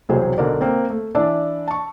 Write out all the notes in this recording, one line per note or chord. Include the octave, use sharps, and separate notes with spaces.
E1 C2 C3 F#3 G#4 C5
B1 D3 A#4 D5
A#3 C4
A3
E3 D4 D5 E5 A5 E6
A5 C#6